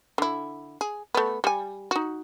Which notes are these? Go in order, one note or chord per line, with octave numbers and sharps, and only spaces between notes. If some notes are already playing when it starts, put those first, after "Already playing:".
D3 E4
G#4
A3 B3
G3 G#5
D#4 F#4